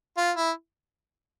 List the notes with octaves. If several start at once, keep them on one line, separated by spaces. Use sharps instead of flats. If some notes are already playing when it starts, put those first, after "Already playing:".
F4
E4